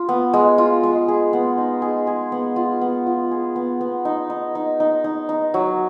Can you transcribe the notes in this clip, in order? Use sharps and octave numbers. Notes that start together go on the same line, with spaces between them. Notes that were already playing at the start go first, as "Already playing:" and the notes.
Already playing: F4
B3
G#3
F4
G#3
G#4
B3
D#4
G#4
G#4
B3
F4
B3
F4
G#4
B3
B3
D#4
D#4
D#4
D#4
D#4
D#4
F#3